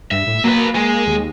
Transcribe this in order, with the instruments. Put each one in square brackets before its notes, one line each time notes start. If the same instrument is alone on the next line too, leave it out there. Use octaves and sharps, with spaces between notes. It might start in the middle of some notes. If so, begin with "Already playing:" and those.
[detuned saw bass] G2 [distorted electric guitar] E5
[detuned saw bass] A2
[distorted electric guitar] F#3 B4 [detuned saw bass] A#3
[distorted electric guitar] G#3
[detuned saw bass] D#2